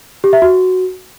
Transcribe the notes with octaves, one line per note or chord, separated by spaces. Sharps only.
G4
E5
F#4